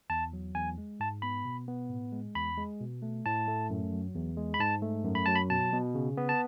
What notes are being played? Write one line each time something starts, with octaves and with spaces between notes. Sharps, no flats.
E2 A5
F#3
E2 G#5
G#3
G#2 A5
B3 B5
B2
B3
A2
G#3
E2 B5
G#3
B2
A3
A2 A5
A3
F#2
F#3
E2
G#3
B5
G#2 A5
A3
F#2
B5
F#3 A5
B5
B2 A5
B2
C#3
B3
A5